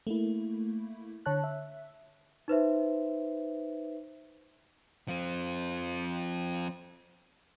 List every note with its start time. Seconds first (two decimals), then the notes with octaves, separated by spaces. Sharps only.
0.07 A3 A#3 E4
1.26 D3 C#5 A5 F#6
1.44 E5
2.48 D#4 B4 C5 E5
5.08 F3 C4